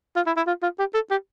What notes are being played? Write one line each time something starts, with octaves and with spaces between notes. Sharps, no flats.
F4
E4
E4
F4
F4
G4
A4
G4